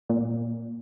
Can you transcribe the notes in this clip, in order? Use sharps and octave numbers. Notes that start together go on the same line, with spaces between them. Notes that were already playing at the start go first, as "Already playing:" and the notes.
A#2